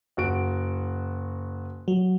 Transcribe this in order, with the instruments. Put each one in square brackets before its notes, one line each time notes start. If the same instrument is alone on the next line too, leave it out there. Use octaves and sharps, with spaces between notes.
[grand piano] F#1 F#4 D7
[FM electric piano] F#3